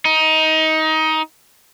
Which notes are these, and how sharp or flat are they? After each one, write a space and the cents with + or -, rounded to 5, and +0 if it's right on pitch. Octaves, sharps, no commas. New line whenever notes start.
D#4 +20